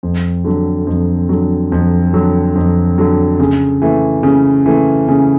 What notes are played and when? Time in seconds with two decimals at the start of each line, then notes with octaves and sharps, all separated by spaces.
0.03 F2
0.45 D3 F#3
0.87 F2
1.29 D3 F#3
1.72 F2
2.13 D3 F#3
2.55 F2
2.98 D3 F#3
3.40 C#3
3.82 E3 A3
4.23 C#3
4.66 E3 A3
5.08 C#3